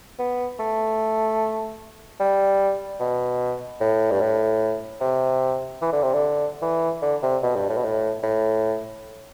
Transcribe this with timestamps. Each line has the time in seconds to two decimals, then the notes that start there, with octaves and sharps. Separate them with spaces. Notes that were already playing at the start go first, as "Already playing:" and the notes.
0.19 B3
0.59 A3
2.20 G3
3.00 B2
3.80 A2
4.11 G2
4.20 A2
5.01 C3
5.82 E3
5.92 D3
6.03 C3
6.14 D3
6.62 E3
7.02 D3
7.23 C3
7.43 B2
7.56 G2
7.69 A2
7.77 B2
7.84 A2
8.23 A2